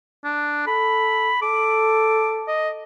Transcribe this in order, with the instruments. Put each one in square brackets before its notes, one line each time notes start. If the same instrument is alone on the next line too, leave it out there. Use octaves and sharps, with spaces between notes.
[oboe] D4
[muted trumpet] A4 [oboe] B5
[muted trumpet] A4 [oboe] D6
[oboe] D#5